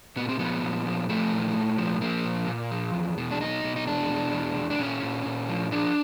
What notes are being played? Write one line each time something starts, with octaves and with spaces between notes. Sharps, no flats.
A#2 B3
C4
F3 B3
A#2
F3
F3 A3
A#2
A#2
F3
F3 A#3
A#2
A#2
F3
E2
B2
D4
B2 D#4
B2
D#4
E2 D4
B2
E2
E2
D4
A#2 C#4
A#2
A#2
F3
F3 D4